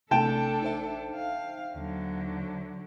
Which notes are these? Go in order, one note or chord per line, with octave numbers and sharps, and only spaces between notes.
A1 C3 A3 D4 A4 G5 A5
D#4 C5 E5
F5
D#2 D3 F#3